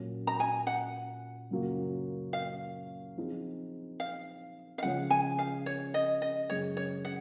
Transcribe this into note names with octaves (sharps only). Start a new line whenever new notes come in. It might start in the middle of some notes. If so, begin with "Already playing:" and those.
Already playing: A#2 F#3 C#4
A#5
G#5
F#5
F#2 C#3 F#3 A#3 F4
F5
F3 C4 D#4 G#4
F5
F5
C#3 F3 G#3 C#4 G#4 F#5
G#5
F5
C#5
D#5
D#5
F#2 C#3 G#3 C#4 G#4 C#5
C#5
F#5